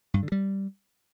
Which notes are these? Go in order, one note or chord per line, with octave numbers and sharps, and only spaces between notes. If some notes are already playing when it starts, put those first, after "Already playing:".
G2
D3
G3